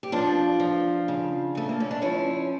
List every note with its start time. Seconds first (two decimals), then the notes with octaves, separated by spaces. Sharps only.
0.03 G4
0.12 F3 D4 F4
0.60 F3
1.08 C#3
1.55 C#3 A3
1.69 A#3
1.80 C#4
1.91 D4
2.02 F3 C#4 E4